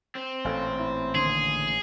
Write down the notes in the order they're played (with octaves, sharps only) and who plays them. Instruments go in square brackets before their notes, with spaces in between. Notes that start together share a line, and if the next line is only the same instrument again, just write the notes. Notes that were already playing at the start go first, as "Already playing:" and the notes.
[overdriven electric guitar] C4
[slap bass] A1 A#2 [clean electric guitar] A4 F5 G#5
[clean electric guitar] E4
[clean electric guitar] D#2 D3 C6 [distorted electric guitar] G#4